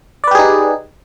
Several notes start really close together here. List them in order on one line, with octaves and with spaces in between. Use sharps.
D5 B4 G4 G#4 D#4